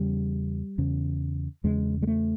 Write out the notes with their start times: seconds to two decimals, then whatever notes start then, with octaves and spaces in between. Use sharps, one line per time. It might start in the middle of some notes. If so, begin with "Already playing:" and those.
Already playing: E2 C#3 G3
0.78 E2 C#3
1.64 E2 C#3 G#3
2.02 G#3
2.07 A3